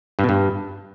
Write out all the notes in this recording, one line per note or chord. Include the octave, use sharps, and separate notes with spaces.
G2
B2
G2